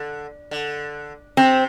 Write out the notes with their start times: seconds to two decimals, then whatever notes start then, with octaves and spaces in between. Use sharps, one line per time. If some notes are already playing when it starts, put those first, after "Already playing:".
Already playing: D3
0.51 D3
1.37 C3 C4